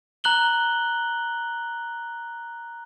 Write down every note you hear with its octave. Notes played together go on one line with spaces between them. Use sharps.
A#5 F#6 F#7 G7